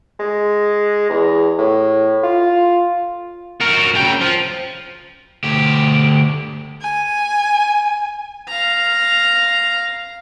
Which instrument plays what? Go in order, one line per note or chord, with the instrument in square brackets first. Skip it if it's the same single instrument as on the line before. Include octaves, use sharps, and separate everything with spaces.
[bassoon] G#3
E2
A2
F4
[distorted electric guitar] F#4 A#4
C#3 G5
F3
[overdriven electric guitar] D2 G4
[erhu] G#5
[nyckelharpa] F5 A#5